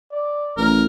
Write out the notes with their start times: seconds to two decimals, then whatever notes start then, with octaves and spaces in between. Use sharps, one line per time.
0.12 D5
0.57 A1 A#4